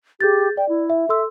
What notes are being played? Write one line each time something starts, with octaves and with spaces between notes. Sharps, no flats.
G4 G#4 G6 A6
D5 G5
E4
E5
A4 E5 C6 E6